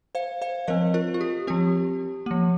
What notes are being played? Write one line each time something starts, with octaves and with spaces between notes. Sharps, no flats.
C5 F5
C5 F5
F3 C4 A#4 D#5
F4 A#4
F4
G4
F3 C4 G4
F3 A#3